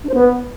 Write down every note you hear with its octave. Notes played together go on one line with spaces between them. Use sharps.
D4
C5
B3